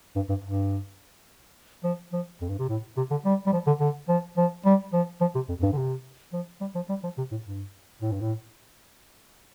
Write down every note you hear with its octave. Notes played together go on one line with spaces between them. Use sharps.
G2
G2
G2
F3
F3
F2
G2
C3
A2
C3
D3
G3
G3
F3
D3
D3
F3
F3
G3
F3
F3
C3
F2
F2
G2
D3
C3
F3
G3
F3
G3
F3
C3
A2
G2
A2
G2
A2